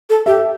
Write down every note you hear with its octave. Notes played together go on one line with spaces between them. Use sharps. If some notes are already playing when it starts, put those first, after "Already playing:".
A4
G4 E5